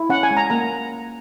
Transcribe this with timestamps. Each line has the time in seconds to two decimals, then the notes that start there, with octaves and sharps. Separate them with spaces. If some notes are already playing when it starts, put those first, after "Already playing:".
Already playing: E4
0.09 C#4 F#5
0.23 G#5
0.31 G#3
0.37 A#5
0.50 A#3 A#5